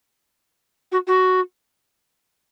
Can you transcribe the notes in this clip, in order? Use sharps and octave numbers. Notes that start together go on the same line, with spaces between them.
F#4
F#4